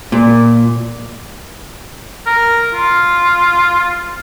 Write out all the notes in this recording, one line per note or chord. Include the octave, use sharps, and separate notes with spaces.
A#2
A#4
F4